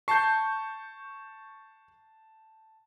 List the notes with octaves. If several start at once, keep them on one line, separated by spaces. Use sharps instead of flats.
A5 C#6 G6 C7